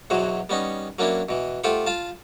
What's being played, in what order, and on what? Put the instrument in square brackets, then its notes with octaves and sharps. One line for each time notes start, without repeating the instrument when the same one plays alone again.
[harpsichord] E2 B2 E3 F#3 C5
G3 B3 C#4 D#4
F#3 A#3 C#4 D4 E4
B2 E3
A3 F4 G4 C5 F#5
F4 F5 A5